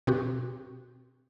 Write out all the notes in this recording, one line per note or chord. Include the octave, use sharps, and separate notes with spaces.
B2 C4 F#4 G4